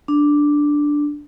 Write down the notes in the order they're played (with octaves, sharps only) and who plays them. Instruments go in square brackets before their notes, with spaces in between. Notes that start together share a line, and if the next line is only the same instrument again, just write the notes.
[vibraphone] D4